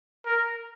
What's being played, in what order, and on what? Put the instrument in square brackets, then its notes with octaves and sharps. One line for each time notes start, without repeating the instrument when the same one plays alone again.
[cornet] A#4